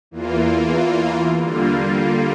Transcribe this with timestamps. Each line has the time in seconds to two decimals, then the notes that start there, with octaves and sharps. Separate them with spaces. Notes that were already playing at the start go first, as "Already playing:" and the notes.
0.11 E2 E3 A#3 F4
1.41 D3 G3 A#3 F4